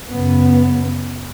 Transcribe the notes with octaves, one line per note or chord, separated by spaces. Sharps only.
F#2 C#3 B3